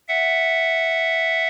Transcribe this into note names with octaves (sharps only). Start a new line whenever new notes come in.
E5 F#5